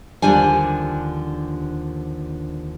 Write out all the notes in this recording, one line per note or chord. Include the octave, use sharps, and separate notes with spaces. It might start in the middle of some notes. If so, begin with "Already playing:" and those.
D#2 D3 F3 G3 D4 G#5